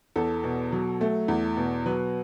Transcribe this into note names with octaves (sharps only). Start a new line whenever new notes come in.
E2 A4
B2
F#3
A3
E2
B2
F#3 B4